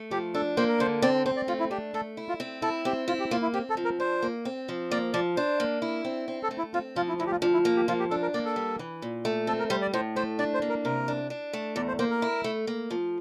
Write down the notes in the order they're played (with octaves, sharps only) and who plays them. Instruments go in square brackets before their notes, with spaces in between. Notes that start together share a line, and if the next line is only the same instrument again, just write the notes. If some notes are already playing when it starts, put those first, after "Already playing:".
Already playing: [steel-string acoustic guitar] A3
[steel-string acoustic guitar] F3 [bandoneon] G4
[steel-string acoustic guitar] D4 [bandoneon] A4
[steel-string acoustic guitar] A#3 [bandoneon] C5
[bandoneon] A#4
[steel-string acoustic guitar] D3 [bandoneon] C5
[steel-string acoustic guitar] C4 [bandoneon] D5
[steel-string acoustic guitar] C4 [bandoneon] C5
[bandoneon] D5
[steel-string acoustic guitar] A3 [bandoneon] F4
[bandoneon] E4
[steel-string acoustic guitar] D4 [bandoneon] G4
[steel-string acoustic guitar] A3 [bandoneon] A4
[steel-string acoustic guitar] E4
[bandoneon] F4
[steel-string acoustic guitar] C4
[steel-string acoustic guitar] E4 [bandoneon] A4
[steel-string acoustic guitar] C4 [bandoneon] G4
[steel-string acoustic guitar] E4 [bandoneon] F4
[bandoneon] G4
[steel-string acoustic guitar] A#3 [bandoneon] F4
[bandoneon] E4
[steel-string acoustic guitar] C4 [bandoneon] G4
[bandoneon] A4
[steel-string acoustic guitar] F3
[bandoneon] A#4
[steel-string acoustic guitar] D4 [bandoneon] C5
[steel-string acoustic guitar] A#3
C4
F3
[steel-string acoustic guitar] A#3 [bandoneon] D5
[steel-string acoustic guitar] F3 [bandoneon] D5
[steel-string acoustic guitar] D4 [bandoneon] C5
[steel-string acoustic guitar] A#3
E4
C4
C4
[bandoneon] A4
[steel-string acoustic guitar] A3
[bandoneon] E4
[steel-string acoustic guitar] C4 [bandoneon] F4
[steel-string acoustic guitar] F3 [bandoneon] F4
[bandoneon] E4
[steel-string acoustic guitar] D2 [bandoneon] E4
[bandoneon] G4
F4
[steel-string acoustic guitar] F3 [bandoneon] D4
[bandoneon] E4
[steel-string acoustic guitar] A#3
[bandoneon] G4
[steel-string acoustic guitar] F3 [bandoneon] F4
[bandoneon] G4
[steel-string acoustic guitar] D4 [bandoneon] A4
[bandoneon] A#4
[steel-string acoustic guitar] A#3 [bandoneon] D5
[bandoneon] A4
[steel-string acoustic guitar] G3
E3
A#2
A3
[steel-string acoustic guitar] C4 [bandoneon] A4
[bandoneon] A#4
[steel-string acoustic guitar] G3 [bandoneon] C5
[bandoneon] D5
[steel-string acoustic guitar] A2 [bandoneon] C5
[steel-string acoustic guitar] A3 [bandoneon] C5
[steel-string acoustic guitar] D4 [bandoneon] D5
[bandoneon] C5
[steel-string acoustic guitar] A#3
[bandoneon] A#4
[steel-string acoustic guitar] C3 [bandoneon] A#4
[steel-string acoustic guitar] D4
D4
A3
[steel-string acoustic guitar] E2 [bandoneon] D5
[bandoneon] C5
[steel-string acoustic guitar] A#3 [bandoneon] C5
[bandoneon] A#4
[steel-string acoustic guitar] E4
A3
A#3
F3